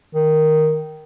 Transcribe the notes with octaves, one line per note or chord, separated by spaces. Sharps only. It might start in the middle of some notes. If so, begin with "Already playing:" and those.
D#3